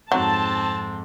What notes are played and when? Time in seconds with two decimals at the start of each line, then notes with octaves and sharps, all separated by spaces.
0.12 F2 G#2 F#3 C4 A5